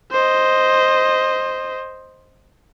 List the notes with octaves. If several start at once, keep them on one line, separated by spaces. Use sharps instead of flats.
C5 D#5